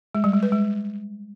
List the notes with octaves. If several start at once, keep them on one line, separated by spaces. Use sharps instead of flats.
G#3
G3
G#3
B4
G#3